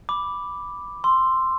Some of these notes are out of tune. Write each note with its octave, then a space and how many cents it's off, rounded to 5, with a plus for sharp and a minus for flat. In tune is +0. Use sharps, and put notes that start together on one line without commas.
B5 +0 D6 +0
C6 +0 E6 +10